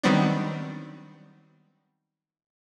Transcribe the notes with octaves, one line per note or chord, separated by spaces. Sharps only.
D#3 F#3 G3 B3 C4 D4